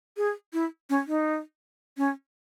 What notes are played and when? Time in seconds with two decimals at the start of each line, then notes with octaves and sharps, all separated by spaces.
0.17 G#4
0.53 E4
0.90 C#4
1.07 D#4
1.97 C#4